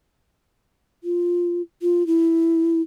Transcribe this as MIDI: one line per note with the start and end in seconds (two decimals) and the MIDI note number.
1.04 1.62 65
1.82 2.06 65
2.07 2.82 64